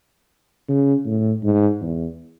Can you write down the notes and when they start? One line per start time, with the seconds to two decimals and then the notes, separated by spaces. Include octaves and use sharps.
0.68 C#3
1.06 A2
1.43 G#2
1.81 E2